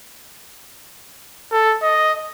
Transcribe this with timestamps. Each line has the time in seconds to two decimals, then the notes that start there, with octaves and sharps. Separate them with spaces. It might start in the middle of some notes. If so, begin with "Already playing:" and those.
1.52 A4
1.82 D#5